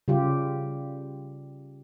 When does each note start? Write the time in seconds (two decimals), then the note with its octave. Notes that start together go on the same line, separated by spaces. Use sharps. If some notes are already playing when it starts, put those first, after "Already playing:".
0.08 C#3 G3 F4 G4